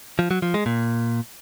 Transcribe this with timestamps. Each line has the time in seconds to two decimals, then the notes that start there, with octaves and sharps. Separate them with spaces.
0.19 F3
0.31 F#3
0.42 F3
0.54 G#3
0.66 A#2